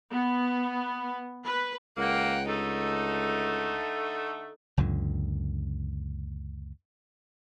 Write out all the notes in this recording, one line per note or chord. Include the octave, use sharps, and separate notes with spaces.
B3
B4
C#2 A#3 F#5 G5
D3 A3 D#4 A4
C#2 F#2 A#2 D3